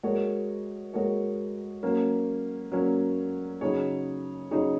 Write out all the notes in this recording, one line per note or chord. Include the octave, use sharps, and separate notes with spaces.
G#3 F#4 A#4 C#5
G#3 F#4 A#4 C#5
F#3 A#3 C#4
F#3 A#3 C#4
C#3 F#3 D#4 G#4 C#5
C#3 F#3 D#4 G#4 C#5